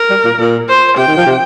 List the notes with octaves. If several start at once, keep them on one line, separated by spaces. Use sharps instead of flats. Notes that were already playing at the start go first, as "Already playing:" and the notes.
Already playing: A#4
G3
A#2
A#2
C5
C3 G5
D#3
F3
C3